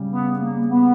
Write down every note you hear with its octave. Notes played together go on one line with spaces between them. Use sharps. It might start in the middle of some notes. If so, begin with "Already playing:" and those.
Already playing: C#3 G3
B3
A#3
B3